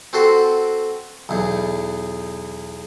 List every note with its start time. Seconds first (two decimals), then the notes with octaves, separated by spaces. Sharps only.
0.13 C4 F#4 A4 C6
1.29 B1 E2